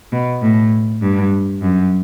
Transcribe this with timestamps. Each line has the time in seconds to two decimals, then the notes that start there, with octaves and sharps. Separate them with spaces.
0.12 B2
0.42 A2
1.01 G2
1.61 F#2